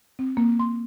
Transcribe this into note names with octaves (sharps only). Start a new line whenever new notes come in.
C4
A#3
C6